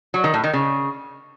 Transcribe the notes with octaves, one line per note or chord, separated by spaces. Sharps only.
F#3
D#3
A2
D#3
C#3